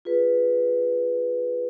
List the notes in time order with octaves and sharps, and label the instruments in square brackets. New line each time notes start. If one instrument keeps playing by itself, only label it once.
[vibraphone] F4 G#4 B4